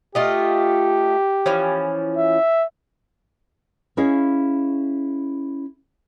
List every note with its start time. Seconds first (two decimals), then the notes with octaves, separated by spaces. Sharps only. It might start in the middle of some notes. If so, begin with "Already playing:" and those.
0.15 A3 F4 G4 D#5
1.46 E3 F3 C#4
2.17 E5
3.97 C#4 E4 G#4 C#5 D#5 F5